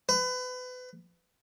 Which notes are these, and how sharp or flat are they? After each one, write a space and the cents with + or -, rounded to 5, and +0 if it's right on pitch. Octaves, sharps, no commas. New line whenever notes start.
B4 +30